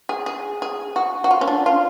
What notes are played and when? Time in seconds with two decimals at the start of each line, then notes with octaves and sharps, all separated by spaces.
0.09 G#4
0.26 G#4
0.62 G#4
0.96 F#4
1.24 F#4
1.31 F4
1.41 C#4
1.48 D4
1.66 F4